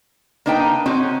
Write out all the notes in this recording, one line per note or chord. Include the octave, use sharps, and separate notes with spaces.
A#3 D4 D#4 B4 G5
C4 C#4 D#4 F#4